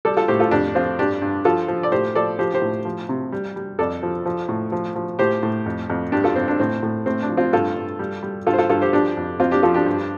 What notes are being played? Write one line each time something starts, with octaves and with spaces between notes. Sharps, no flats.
G3 A4 D5
F4 A4
A2 G4 C5
F4 A4
F2 D4 G4
F3 C4 F4
G2 D4 G4
G2
F3 F4 A4
F3
D5
A2 G4 C5
F3 A4 D5
F3 G4 C5
G4 C5
A2
F3
C3
G3
G3
F2 A4 D5
F3
F3
A2
F3
F3
A2 G4 C5
A2
F2
F2
G2 D4 G4
F4 A4
G2 C4
D4
A2 C4
A2
A2 C4
D4
F3
C4 F4
G2 F4 A4
G2
G3
G3
G2 F4 A4
C5
F4 A4
G2 F4 A4
G4 C5
F3 D4 G4
F2
F2 C4 F4
D4 G4
F3 F4 A4
D4 G4
G2